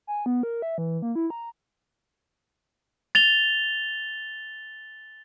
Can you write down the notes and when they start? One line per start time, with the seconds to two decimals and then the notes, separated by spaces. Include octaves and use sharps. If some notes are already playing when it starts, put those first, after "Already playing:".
0.07 G#5
0.26 B3
0.43 A#4
0.62 E5
0.78 E3
1.02 A#3
1.15 E4
1.30 A#5
3.15 A6 F7 G7